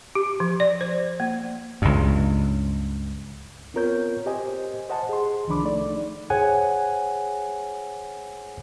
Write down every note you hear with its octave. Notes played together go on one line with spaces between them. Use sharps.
G4
F3
D5
C5
A#3
C#2 G2
B3 C4 F4 A#4 C#5 G6
G4 C5 D#5 G#5
C5 D#5 F#5 G#5 A5
G#4 C6
C2 D#3 F3 D4 B5 D6
A3 D#4 D5
G#4 C5 C#5 F#5 G#5